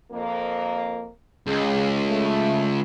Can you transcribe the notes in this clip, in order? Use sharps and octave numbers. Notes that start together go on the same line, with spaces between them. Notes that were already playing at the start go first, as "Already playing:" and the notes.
F2 A#3
C#2 G#3 G#4
A3